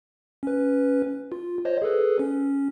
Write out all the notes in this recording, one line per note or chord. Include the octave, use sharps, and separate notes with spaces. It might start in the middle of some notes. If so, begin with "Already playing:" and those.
C#4 B4
F4
C5 C#5 D#5
G#4 A4 B4
C#4